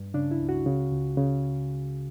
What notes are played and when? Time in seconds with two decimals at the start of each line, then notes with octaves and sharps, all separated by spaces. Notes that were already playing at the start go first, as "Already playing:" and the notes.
Already playing: G2
0.14 C#3 D4
0.31 E4
0.40 C#2
0.49 F#4
0.66 C#3
0.91 C#2
1.17 C#3